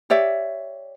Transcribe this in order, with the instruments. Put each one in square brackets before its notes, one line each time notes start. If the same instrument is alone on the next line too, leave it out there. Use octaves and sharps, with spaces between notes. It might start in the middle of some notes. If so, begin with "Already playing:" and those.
[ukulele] G4 C#5 D5 E5